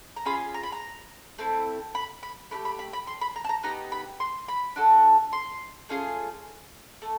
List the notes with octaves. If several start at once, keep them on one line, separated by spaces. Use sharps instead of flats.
A#5
C#4 F4 G#4 B5
A#5
B5
A#5
A3 C4 E4
B5
B5
A3 D4 G4 B5
B5
B5
B5
C6
B5
A#5
A5
A#5
B3 D#4 G4 A#5
B5
C6
B5
D4 F#4 A4
C6
A3 C#4 F4 G#4
A3